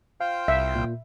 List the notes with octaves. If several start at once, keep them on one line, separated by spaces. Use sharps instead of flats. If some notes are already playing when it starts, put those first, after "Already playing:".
F4 C5 F5 G5
C2 E5
A#2